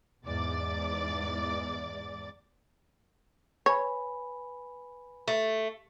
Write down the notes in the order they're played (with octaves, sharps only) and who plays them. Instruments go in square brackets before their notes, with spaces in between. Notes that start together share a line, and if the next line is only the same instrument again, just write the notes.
[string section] E2 G#2 D5 D6 A6
[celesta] B4 G#5 B5 [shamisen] C#5
[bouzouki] A3